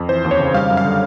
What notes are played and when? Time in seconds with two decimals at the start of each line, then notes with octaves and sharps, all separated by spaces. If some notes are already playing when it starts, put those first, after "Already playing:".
Already playing: F2
0.09 E3 C5
0.24 D#2
0.31 C#5
0.39 C#3
0.54 G3 F5
0.70 F#2
0.77 F5
0.84 D3